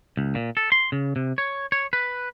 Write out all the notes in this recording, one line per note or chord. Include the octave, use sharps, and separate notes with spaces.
C#2
A#2
A4
C6
C#3
C3
C#5
C#5
B4